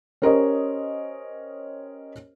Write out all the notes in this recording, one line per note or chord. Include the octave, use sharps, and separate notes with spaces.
C#4 G4 A#4 C5 C#5 D#5